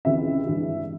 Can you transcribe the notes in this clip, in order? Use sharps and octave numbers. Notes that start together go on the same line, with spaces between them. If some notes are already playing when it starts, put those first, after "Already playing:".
C#2 C3 E3 E5
G2 E3 G#3